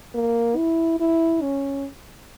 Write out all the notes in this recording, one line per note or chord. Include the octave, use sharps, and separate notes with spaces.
A#3
E4
E4
C#4